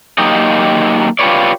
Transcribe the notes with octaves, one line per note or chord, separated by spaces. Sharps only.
F#3 A#3 D#4 G4 D#5
F4 G4 G#4 B4 C#5 D5